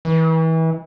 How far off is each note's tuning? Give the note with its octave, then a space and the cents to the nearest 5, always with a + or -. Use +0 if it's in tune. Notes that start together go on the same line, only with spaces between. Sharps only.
E3 -30